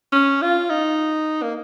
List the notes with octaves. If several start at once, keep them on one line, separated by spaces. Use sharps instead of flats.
C#4
F4
D#4
A#3